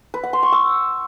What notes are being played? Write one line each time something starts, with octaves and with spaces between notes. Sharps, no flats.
B4
F#5
C6
C#6
E6